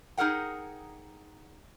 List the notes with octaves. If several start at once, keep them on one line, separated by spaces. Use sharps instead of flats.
D#4 G#4 A#4 F#5 G5